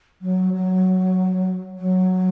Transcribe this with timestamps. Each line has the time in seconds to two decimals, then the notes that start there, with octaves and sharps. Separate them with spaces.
0.22 F#3
0.53 F#3
1.79 F#3